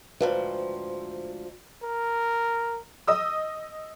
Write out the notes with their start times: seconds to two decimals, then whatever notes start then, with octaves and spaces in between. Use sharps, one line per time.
0.20 D2 G#2 F3 B4 F5 G5
1.83 A#4
3.07 D#5 D#6 E6